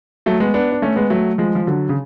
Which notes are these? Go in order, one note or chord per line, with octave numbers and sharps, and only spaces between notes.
F#3 A3
G#3 B3
B3 D4
D4
A3 C#4
G#3 B3
F#3 A3
F3 G#3
F3
D3 F#3
C#3